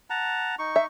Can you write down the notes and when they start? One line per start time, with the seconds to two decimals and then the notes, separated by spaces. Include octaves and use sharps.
0.10 F#5 A5 A#5
0.59 D#4 C#6
0.76 E5